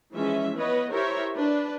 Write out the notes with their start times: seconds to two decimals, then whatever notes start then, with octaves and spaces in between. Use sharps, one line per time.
0.12 E3 F3 G#3 C#4 E5
0.56 B3 B4 C#5 D#5
0.91 E4 G4 A#4 C5 C#5 E5
1.36 D4 B4